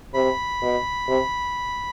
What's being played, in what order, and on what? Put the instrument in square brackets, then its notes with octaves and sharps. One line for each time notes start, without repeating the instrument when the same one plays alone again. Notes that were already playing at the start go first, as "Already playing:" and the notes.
[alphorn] C3 [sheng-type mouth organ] B5
[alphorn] B2
C3